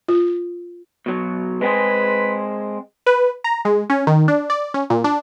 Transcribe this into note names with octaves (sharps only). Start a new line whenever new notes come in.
F4
B2 F#3
G#3 C4 G#4 B4
B4
A#5
G#3
C#4
D#3
D4
D5
C#4
A#2
D4